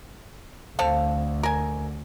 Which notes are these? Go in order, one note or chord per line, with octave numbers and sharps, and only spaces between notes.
D2 C4 A4 F5
A#4 G#5